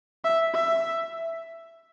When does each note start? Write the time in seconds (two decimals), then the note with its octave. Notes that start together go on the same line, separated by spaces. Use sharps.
0.24 E5
0.54 E5